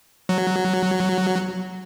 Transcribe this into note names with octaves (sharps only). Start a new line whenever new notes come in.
F#3